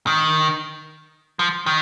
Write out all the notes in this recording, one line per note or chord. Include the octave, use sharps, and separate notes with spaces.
D#3
F3
D#3